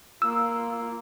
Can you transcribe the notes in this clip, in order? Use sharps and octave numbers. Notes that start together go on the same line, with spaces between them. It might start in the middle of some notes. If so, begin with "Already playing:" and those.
A#3 F4 E6